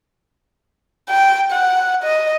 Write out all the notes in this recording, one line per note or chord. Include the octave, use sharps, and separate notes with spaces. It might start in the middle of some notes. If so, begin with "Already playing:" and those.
G5
F#5
D#5